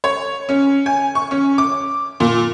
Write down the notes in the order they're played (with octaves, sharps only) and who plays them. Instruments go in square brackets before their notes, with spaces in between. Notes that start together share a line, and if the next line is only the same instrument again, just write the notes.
[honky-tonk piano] C#5
C#4
G#5
C#6
C#4
D6
A#2